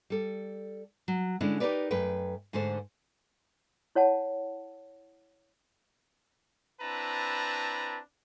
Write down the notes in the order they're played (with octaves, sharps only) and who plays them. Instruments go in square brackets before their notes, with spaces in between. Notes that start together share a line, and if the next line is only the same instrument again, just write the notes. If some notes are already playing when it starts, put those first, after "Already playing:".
[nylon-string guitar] G3 A4
F#3
D3 G#3 C#4 D4 E4
D#4 G4 G#4 A#4 B4 D5
F#2 A3 B4 G5
G#2 D3 A3 A4 C5
[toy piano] E4 C#5 F#5 A5
[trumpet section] C4 D4 E4 B4 A5 A#5